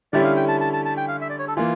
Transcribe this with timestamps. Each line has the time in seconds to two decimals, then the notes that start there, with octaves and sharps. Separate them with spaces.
0.13 D3 G3 C#4 E4 G4 D5
0.24 F5
0.37 G5
0.48 A5
0.61 A5
0.73 A5
0.85 A5
0.97 G5
1.08 F5
1.21 E5
1.30 D5
1.39 C#5
1.48 A4
1.57 E3 A#3 F4